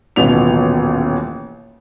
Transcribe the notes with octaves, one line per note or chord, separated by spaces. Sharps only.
D#1 A1 B2 F7